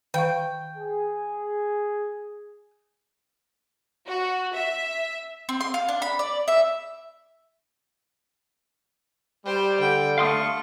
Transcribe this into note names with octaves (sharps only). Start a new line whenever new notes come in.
D#3 F5 G5 C#6
G#4
F#4
E5
C4
C6
F5
D4
B5
D5
E5
G3 G4 C5
D3 G5
A3 F5 C6 C#6 D#6